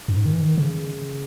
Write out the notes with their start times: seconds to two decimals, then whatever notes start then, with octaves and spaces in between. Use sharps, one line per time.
0.08 F#2
0.17 G#2
0.25 D#3
0.33 E3
0.41 D#3
0.57 C#3